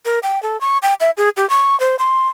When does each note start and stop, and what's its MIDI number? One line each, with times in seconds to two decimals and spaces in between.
0.05 0.19 70
0.23 0.41 79
0.43 0.60 69
0.61 0.78 85
0.83 0.94 79
1.00 1.11 76
1.17 1.29 68
1.37 1.48 67
1.50 1.78 85
1.80 1.96 72
1.99 2.28 84